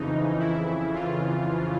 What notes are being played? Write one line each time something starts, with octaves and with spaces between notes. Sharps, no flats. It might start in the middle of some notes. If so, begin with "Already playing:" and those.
Already playing: F2 C#3 E3 D#4
E4
F4